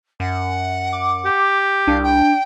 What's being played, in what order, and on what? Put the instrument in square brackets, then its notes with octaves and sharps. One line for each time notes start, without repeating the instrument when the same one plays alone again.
[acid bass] F#2 [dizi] F#5
[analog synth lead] D6
[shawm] G4
[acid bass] C2 [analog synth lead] D4 [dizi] F5
[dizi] G5